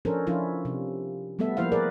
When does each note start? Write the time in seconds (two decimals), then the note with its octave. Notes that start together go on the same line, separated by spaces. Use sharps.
0.05 F3 C#4 D4 A4 A#4 C5
0.27 F3 C#4 D4 E4 F4
0.65 C3
1.39 G3 A3 B3 A4 E5
1.57 F3 A#3 E4 C5 F5
1.72 G#4 A#4 B4 D5